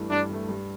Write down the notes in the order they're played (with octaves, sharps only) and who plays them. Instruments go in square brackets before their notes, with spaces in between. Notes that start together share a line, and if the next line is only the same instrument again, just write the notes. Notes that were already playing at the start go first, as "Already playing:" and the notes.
Already playing: [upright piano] G2 E3 A3
[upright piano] G2 [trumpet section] D4
[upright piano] E3 A3
G2